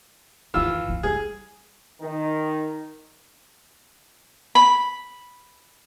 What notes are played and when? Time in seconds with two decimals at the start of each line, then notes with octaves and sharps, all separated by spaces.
0.54 F#2 D#3 E3 F4 E6
0.89 D#3
1.03 G3 G#4
2.02 D#3
4.55 B5